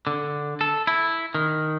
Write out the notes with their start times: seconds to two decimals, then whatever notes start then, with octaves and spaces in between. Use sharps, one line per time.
0.07 D3
0.61 A4
0.87 E4
1.35 D#3